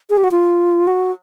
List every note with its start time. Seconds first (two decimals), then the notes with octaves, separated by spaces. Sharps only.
0.10 G#4
0.17 G4
0.24 F#4
0.31 F4
0.87 F#4